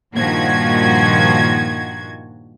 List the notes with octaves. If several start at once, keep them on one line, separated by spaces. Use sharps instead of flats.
G2 A#2 D#3 F3 F#4 G#6